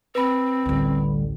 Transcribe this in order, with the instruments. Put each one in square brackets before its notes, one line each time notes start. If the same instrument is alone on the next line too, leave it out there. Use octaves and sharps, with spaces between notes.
[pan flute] C4 [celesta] B4 B5
[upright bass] A1 D2 [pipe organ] D3 G3